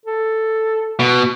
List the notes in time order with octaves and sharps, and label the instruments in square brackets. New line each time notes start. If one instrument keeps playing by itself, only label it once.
[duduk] A4
[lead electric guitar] B2